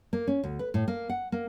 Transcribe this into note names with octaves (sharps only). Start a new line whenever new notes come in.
A#3
C#4
D2
B4
A2
A#3
F#5
A#3